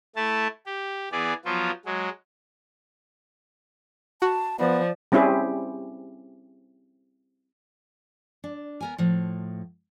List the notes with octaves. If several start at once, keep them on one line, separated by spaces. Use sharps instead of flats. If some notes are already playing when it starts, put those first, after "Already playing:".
A3 E4 A5
G4
E3 B3 G#4 D5
F3 F#3 B3 F4
F#3 G#3
F#4 A5
F3 B3 D5
G3 C4 C#4 E4 G4 G#4
D4
B3 A#4 G#5
A2 F3